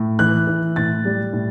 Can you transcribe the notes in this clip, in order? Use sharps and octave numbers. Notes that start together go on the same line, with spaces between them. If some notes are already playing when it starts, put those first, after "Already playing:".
Already playing: A2
E3 F#6
E3
A2 A6
G3
A2